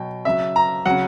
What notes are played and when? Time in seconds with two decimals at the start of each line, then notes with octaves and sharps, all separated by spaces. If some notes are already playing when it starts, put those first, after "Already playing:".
Already playing: B2 F#3 G5
0.25 C#3 F#3 E5
0.56 A#5
0.85 C#3 F#3 F#5